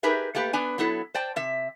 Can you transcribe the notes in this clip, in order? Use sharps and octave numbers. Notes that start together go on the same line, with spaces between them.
D#4 G4 G#4 A#4 B4 E5
A3 A#3 G4 B4
B3 D4 G#5
F#3 B3 E4 A4
C5 D5 G5 A5
C3 E5